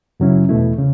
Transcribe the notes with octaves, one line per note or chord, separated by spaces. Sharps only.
F#2 C#3 F#3 C#4 E4
E2 B2 A3 E4
C#3